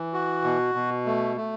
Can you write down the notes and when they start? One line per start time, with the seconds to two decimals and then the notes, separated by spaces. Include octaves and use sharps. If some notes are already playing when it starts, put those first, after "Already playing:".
Already playing: E3
0.13 F#4
0.44 B2
0.75 B2
1.06 A3
1.37 A3